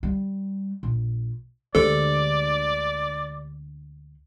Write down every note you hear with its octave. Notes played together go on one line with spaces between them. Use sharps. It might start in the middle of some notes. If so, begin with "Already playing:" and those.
G3
A#1
D2 D3 G#3 G4 A4 C5 D5